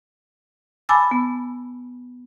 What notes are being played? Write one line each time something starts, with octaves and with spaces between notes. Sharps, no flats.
G#5 A5 B5 D6 E6 A6
B3